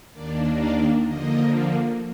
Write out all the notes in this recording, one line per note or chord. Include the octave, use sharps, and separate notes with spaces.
D#2 D#3 A#3 D4 D5
F5
D3 F3 A#3 D#5